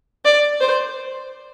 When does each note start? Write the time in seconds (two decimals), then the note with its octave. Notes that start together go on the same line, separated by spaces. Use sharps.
0.25 D5
0.61 C5